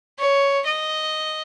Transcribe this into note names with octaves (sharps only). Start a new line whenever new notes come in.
C#5
D#5